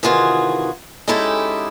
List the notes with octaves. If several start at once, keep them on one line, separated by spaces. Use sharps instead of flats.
C3 D#3 E3 F4 F#4 G#4
G#3 C#4 D#4 E4 G4 A4